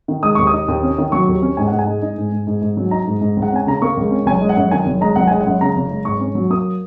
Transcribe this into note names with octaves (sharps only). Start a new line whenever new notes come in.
D#3
G#3 D#6
D#2 C#6
D#6
D#4
D#2
C#4
D#3
F#3 C#6
D#2
C#4
G#2 G#5
G#2 F#5
G#5
G#3
D#4
G#2
G#2
G#2
G#2
F#3
D#4 A#5
G#2
G#2
C#2
F#5
C#4 G#5
C#3 A#5
A#3 C#6
C#2
C#4
F#1 G#5
G#3
F#5
F#2
D#3 G#5
F#1
G#3 A#5
F#1 F#5
G#3 G#5
F#5
F#2
C#3 A#5
F#1
G#3
G#2 C#6
C#4
F#3
A#3 D#6